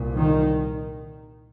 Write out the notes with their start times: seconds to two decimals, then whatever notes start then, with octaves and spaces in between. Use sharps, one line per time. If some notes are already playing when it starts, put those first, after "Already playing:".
Already playing: C2 A#2
0.15 D#3